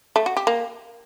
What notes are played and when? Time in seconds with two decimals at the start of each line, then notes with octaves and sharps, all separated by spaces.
0.16 A3
0.26 F#4
0.37 G4
0.47 A#3